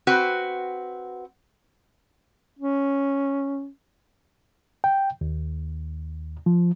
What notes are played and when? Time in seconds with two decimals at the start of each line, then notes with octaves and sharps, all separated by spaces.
0.07 C4 F#4 B4
2.59 C#4
4.84 G5
5.21 D#2
6.46 F3